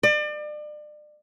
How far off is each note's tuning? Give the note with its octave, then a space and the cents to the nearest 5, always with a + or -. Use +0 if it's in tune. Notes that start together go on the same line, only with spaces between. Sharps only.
D5 +35